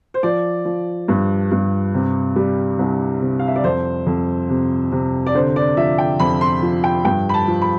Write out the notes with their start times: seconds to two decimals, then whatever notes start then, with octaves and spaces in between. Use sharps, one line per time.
0.14 C5
0.23 F3 D5
0.65 F3
1.08 G2
1.51 G2
1.94 C3
2.36 G3
2.79 C2
3.21 C3
3.39 F5
3.48 E5
3.56 D5
3.64 F2 C5
4.06 F2
4.50 C3
4.92 C3
5.27 D5
5.34 D3 C5
5.56 D5
5.77 F3 E5
5.98 G5
6.19 F2 B5
6.41 C6
6.62 F3
6.84 G5
7.05 G2 G5
7.29 B5
7.34 A5
7.47 F3
7.61 B5